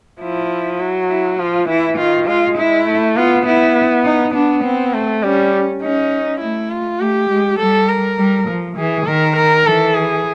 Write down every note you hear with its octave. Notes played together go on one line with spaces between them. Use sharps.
F3 E4
F#3
E4
F3 F4
E3 E4
D#3 F4
G#3 F4
E4
A3
B3 F4
B3 E4
D#4
B3 D4
C4
A3
G3 C#4
C#4 D#4
A3 E4
F4
A3 G4
G#3
G3 A4
A#4
G3
F3
E3 G#4
D#3 A#4
A#4
E3 A4
G#4